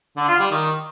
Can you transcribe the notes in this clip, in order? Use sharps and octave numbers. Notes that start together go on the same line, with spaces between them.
D3
F4
G3
D#3